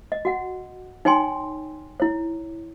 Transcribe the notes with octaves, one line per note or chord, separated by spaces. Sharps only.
D#5
F#4 F#5
D#4 C#5 G5 G#5 C6
E4 C#5